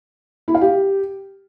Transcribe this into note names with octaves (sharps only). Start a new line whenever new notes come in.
E4
F5
G4